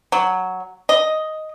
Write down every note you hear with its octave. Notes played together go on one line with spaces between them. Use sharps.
F#3
D#5